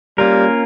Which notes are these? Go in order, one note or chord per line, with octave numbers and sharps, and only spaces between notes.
G3 A#3 C#4 F4 A#4